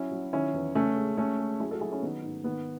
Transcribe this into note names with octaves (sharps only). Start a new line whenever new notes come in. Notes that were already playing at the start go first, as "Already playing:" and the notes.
Already playing: F#3 C#4 E4
F#3
D#3 C#4 E4
E2
C#3 A3 C#4
G#3
G#3 A3 C#4
G#3
F#3 E4 G#4
F#4 A4
F#3 E4 G#4
C#4 E4
D#3 B3 D#4
G#2
D#3 B3